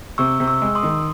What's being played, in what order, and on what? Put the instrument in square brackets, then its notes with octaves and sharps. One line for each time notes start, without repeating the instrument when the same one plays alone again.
[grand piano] C3 [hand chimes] C#6 E6
[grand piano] C3
[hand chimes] C#6 E6
[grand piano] G#3 [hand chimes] E6
[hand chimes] C6 D#6
[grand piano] D#3